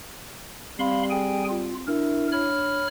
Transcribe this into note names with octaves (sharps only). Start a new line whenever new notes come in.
G3 C4 F5 B5 C6
G#4 G5 G#5
F4
D4 E4 A#4
C#5 B5 F6